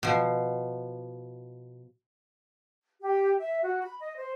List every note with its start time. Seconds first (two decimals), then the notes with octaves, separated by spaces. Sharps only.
0.03 B2 F3
3.02 G4
3.39 E5
3.62 F#4
3.82 B5
4.00 D#5
4.17 C5